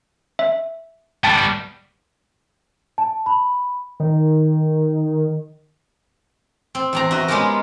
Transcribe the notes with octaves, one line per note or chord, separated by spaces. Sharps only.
E5
G3 B3 G5 A5 A6
A5
B5
D#3
C4
E2 C4 A#5
F#4 D#5 E5
G#3 B3 C#4 F4 G4 A#4